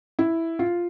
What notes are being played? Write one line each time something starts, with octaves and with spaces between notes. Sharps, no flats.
E4
F4